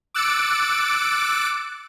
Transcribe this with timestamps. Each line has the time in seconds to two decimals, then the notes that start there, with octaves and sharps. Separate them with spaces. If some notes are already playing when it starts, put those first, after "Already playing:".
0.14 D6 E6 F#6 A6 C#7 D7